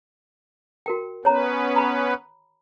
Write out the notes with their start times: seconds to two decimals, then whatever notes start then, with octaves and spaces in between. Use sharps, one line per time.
0.86 F#4 A#4 G5
1.25 B3 C#4 B4 C#5 A#5
1.76 A#5 B5